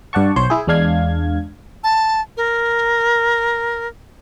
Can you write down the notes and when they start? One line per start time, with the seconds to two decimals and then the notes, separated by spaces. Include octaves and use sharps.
0.13 G2 D5 F#5 A5 C#6
0.36 B1 C5 C#5 G6
0.50 E4 G#4
0.67 E2 G#3 D4 F5 G#6
1.84 A5
2.37 A#4